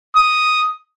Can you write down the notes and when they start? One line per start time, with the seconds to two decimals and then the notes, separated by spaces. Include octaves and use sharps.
0.16 D#6